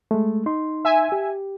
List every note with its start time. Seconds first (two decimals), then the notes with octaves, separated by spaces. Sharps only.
0.11 G#3 A3
0.46 D#4 C6
0.85 E5 G#5
1.12 G4